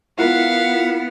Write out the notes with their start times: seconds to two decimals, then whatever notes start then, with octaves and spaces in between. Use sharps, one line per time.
0.19 B3 E4 F4 A#4 F5 F#5